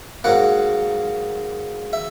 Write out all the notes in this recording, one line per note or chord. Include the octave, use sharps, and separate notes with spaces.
G#2 F#3 A#3 F#5
E5